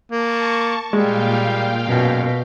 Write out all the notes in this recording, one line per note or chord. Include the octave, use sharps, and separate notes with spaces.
A#3 A5 C#6
A#2 G3 G#3 F5 G5
F#2 B2